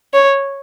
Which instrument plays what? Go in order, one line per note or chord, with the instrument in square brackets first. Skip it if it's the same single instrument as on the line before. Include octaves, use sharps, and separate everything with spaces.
[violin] C#5